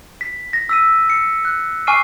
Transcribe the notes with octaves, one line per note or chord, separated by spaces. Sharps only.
B6
A#6
E6 B6 D#7
C#7
F#6
G#5 C#6 D6 F6 C7 D#7